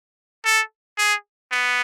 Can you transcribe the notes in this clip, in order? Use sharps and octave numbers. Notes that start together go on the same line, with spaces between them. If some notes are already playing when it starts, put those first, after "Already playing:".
A4
G#4
B3